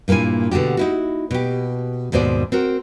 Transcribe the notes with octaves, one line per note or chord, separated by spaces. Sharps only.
G2 A#2 A#3 E4 G#5
B2 D3 D4 F#4 G4
D#4 E4 F#4
B2 G4
D#2 G#2 B2 C5 D5
C4 F#4 A#4